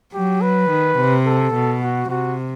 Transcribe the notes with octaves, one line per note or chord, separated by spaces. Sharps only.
F#3 G4
B4
D#3
C3
A4
B2
F#4
C3 F#4